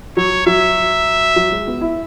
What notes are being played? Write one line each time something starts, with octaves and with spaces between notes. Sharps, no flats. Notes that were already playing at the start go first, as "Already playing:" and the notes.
F#3 C#5
F#3 E5
F#3
G#3
B3
E4